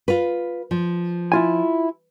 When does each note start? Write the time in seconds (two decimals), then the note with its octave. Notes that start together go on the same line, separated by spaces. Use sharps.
0.08 F4 B4
0.71 F3
1.32 E4 F4 G#5